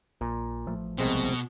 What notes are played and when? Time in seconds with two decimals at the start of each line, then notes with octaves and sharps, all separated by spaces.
0.21 A#1 A#2
0.66 A1 F3 A3
0.98 C2 B2 G#3 C4